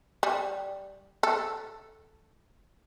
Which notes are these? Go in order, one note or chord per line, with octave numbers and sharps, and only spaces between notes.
G3
A4